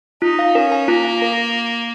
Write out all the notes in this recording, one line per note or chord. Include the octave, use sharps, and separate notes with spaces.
D#4 F4
F5
C#4 A#4
G#5
A#3 F4
F5
A#4